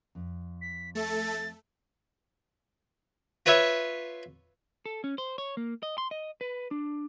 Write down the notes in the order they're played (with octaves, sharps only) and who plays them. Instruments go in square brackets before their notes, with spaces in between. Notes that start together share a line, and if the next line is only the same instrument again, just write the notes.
[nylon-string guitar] F2
[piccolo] B6
[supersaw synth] A3 A4 [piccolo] A6
[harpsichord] F4 B4 C#5 E5
[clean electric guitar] A4
C#4
C5
C#5
A#3
D#5
C6
D#5
B4
D4